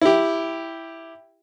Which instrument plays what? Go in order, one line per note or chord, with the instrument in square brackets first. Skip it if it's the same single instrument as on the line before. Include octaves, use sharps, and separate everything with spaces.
[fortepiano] E4 G4